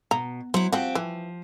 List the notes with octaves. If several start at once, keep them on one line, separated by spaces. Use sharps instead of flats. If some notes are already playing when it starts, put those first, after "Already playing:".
B2 A#5
F#3 E4 C5
F3 C4 F#4 G4
E3 F3